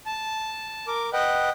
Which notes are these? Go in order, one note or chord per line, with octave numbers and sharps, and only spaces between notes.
A5
A#4 D6
B4 D#5 F#5 G5